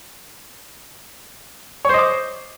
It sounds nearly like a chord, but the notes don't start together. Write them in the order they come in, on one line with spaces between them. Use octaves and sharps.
C#5 C5 D#5 D6